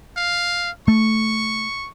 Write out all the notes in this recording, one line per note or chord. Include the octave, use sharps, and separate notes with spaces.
F5
A3 C#6